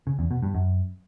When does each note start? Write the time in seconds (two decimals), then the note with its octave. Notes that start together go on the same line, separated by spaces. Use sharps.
0.07 C#3
0.19 E2
0.31 B2
0.43 G2
0.54 F#2